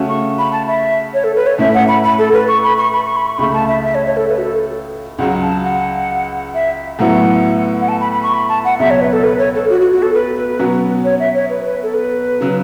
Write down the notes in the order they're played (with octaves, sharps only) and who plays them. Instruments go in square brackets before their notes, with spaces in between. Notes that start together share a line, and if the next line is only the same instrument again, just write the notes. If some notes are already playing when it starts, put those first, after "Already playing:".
Already playing: [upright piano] C#3 A3 C#4 F#4
[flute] C#6
B5
A5
E5
C#5
A4
B4
C#5
[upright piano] A2 A3 C#4 E4 [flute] E5
[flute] F#5
B5
B5
A4
B4
C#6
B5
C#6
B5
C#6
B5
C#6
[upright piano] C#2 C#3 A3 [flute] B5
[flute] A5
E5
E5
C#5
C#5
A4
B4
F#4
A4
[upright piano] C#2 C#3 F#3 [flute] F#5
[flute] A5
F#5
E5
[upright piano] A2 F#3 B3 E4 [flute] F#5
[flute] F#5
A5
B5
B5
C#6
B5
A5
F#5
[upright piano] C#2 B2 F#3 [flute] E5
[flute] C#5
B4
A4
B4
C#5
A4
F#4
F#4
F#4
A4
B4
[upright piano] B2 F#3 C#4 F#4
[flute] C#5
E5
C#5
B4
B4
A4
B4
[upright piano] C#3 F#3